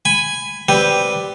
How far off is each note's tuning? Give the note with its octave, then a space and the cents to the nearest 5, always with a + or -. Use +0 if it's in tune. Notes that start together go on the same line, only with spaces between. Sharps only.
G#5 -5 B5 +15
G3 +0 C4 +0 B4 +0